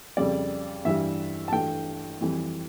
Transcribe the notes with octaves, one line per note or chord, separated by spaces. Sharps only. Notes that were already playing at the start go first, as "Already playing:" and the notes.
F2 C#3 G3 D5
G2 E3 G3 E5
A5
G2 E3 A3 G5
F2 E3 G3